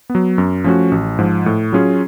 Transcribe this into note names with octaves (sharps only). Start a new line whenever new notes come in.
B3
F#3
F#2
F3 A3 C#4 F#4
A1
G#2 F3
A2
F#3 C#4 F4 G#4